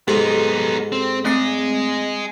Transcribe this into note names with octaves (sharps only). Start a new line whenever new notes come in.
G#2 B3 D#4 G4 A4 C6
C4
A3 C4 G#4 D#5 C7